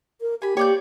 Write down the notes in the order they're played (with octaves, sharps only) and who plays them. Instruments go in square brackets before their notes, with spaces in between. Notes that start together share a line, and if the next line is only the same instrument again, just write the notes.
[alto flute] A#4
[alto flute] G4 [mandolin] G#5 B5
[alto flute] A#3 [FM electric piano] G4 [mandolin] C#5 D5 G6